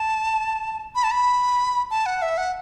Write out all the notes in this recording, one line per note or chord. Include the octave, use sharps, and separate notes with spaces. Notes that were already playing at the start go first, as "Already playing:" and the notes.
Already playing: A5
B5
A5
B5
A5
F#5
E5
F#5